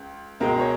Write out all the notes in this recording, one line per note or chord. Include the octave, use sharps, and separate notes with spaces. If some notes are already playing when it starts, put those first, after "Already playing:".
Already playing: C#2
C#2 B2 G#3 A#4
C#5